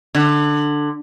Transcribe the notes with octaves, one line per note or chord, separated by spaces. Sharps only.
D3